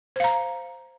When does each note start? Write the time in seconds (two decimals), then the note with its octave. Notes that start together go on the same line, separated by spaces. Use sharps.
0.16 C5
0.20 F5
0.24 A#5